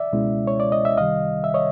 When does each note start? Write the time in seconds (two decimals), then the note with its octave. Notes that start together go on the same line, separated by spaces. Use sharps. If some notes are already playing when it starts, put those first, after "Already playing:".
Already playing: D5 E5
0.12 C#2 B2 G#3 C#4 E4
0.47 C#5
0.60 D5
0.72 D#5
0.85 E5
0.97 C2 C3 D#3 G3 D#5 F5
1.44 E5
1.54 C#5 D#5